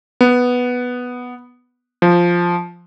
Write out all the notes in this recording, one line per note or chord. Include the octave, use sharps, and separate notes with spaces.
B3
F3